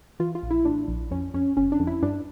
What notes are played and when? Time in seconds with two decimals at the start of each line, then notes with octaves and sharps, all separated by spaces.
0.20 E3 F4
0.35 F4
0.43 A#1
0.51 E4
0.65 A2 D4
0.88 A#1
1.11 F2 C#4
1.34 F2 C#4
1.57 G1 C#4
1.72 D4
1.80 F2
1.87 E4
2.02 G2 D4